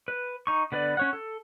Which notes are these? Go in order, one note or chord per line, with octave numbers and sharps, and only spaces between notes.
B4
D#4 C#6
D3 B3 B4 D5
C#4 C#5 F#5
A4